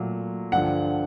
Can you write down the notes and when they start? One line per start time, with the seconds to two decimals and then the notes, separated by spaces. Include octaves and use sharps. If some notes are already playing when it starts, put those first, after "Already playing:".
Already playing: A#2 F#3 A3
0.52 G2 D3 F3 F#5